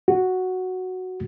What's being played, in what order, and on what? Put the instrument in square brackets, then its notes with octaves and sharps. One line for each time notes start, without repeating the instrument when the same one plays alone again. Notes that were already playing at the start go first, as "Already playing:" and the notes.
[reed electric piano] F#4